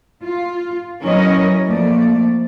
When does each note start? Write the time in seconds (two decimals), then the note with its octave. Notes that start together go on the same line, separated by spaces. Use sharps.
0.24 F4
1.03 E3 F#3 C#4 A#4 C#5 D#5
1.67 F2 A3 A#3 D5